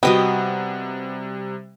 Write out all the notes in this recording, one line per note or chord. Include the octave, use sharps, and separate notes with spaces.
C3 G3 B3 F#4 D#5 G5